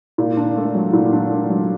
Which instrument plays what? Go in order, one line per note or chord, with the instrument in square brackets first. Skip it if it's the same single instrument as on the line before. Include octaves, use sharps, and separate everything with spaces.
[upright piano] A#2
D4
A3
F#3
A#2
D4
A3
F#3